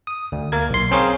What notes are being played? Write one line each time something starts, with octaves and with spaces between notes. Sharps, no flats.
D#6
D2
A#3 A#4 G#6
B1 C6
C4 C#4 G#4 A#4 C#5 F5